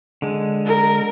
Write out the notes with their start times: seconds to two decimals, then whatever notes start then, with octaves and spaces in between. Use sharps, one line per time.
0.22 D3 G#3
0.66 A#4